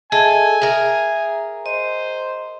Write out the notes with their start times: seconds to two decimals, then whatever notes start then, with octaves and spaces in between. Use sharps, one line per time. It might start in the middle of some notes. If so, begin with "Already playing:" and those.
0.12 G#4 A4 D#5 E5 G#5
0.62 G#4 A#4 E5
1.66 C5 D#5